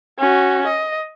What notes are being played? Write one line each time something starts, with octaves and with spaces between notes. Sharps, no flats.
C#4 F#4
D#5